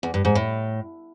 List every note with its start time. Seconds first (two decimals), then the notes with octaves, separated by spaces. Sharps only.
0.03 E2
0.14 G2
0.25 G#2
0.35 A2